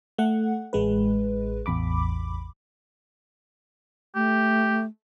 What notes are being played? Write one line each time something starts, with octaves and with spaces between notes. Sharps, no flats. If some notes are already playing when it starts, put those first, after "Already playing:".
A3 F#5
A1 G#3 B4
A1 E2 B5 D6
A3 G4